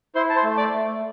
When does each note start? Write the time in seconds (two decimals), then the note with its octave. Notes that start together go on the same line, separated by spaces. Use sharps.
0.15 E4 C5 C6
0.29 A5
0.36 C5 C6
0.44 A3
0.57 D5 D6
0.73 A3